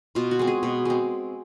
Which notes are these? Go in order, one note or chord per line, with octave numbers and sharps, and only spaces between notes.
B2 F4
F#4
G#3 C4
G#4
B2
G#3 C4